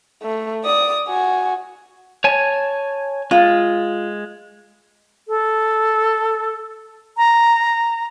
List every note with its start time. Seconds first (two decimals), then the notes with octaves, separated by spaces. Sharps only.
0.23 A3
0.64 D5 D#6
1.08 F#4 G#5
2.24 C#5 G#5 A5
3.31 G#3 F4
5.28 A4
7.17 A#5